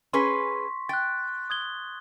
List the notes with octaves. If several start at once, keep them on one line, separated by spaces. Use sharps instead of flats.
C#4 G#4 B4 C6 C#6 B6
G5 F#6 A6
D#6 G#6 G7